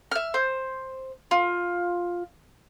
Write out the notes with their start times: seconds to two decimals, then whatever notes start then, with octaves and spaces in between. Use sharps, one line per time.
0.11 E5 F6
0.34 C5
1.31 F4